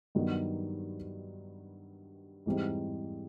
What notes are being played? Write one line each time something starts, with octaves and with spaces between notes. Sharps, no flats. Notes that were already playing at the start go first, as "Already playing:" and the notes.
G2 D#3 F#3 B3 D#4
G#2 E3 G3 C4 D#4